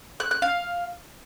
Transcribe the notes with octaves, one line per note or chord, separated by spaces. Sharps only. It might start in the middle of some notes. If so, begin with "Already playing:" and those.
F#6
F#6
F5